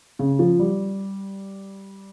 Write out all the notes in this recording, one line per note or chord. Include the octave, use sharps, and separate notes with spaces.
C#3
F3
G3